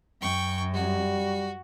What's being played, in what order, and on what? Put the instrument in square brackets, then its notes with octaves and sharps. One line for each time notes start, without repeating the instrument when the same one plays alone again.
[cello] F#2 [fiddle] G5 C#6
[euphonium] G3 [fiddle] F#4